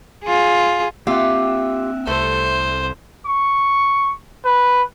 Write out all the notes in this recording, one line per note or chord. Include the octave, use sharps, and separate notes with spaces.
F4 G#4
A#3 C4 F4 G4 E5 F#5
C2 A3 A4 C5
C#6
B4